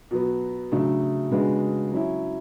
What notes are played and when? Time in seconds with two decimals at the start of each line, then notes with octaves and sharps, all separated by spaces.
0.11 B2 F#3 B3
0.72 C#3 F#3 A3 D4
1.31 C#3 G#3 B3 D4 F#4
1.92 F#3 C#4 E4